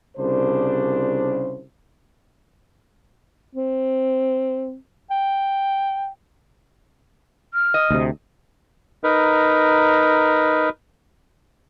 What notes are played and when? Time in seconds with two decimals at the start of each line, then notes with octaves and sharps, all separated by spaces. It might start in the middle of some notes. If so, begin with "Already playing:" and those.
0.17 C2 C#3 D4 C5
3.55 C4
5.11 G5
7.54 F6
7.74 D#5
7.90 D2 C3
9.04 D#4 A#4 B4